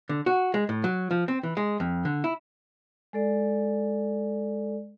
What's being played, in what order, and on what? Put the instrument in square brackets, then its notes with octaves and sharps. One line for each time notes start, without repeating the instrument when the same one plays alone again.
[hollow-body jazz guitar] D3
F#4
G#3
A2
F#3
F3
C4
E3
G#3
F2
D3
E4
[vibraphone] G#3 A4 D5